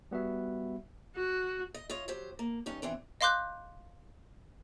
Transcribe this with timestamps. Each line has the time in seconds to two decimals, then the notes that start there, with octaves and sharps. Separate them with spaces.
0.11 G3 B3 F#4 E5
1.16 F#4
1.74 D#5
1.89 F4 C#5 D#5
2.08 F#3 G4 C5
2.39 A#3
2.66 G2 C#4 D#4
2.82 E3 B3 C4 D4
3.21 D#5 F5 C6 D6 F#6 G6